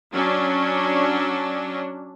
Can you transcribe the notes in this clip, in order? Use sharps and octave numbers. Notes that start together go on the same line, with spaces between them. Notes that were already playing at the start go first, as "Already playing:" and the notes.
F#3 C#4 D4